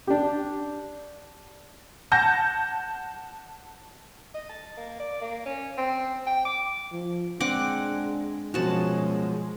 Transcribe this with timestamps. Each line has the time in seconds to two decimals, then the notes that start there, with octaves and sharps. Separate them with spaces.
0.07 D4 G4
2.12 F#5 A5 G6 A#6
4.34 D#5
4.49 A5
4.77 A#3
5.00 D5
5.21 A#3
5.46 C#4
5.78 C4
6.27 G5
6.45 D6
6.92 F3
7.40 G#3 C4 D4 F#5 D6
8.54 F#2 B2 F3 F#3 G#3 F#4 A5